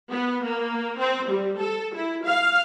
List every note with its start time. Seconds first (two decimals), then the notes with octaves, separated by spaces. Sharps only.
0.11 B3
0.44 A#3
0.98 C4
1.30 G3
1.59 A4
1.95 E4
2.26 F5